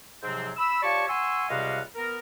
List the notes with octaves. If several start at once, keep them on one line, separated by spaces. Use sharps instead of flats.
G#2 C3 F3 F#3 C4
B5 E6
F4 G4 C#5 D5 A5 C#6
F#5 G#5 C6 C#6 E6
C#2 C3 G3 D#5 F5 F#5
B3 A#4